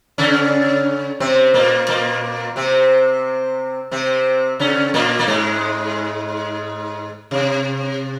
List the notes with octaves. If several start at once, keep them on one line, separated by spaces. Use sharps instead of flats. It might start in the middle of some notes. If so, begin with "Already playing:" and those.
C#3 C#4
C3 C4
A#2 A#3
A#2 A#3
C3 C4
C3 C4
C#3 C#4
A#2 A#3
A#3
G#2 G#3
C3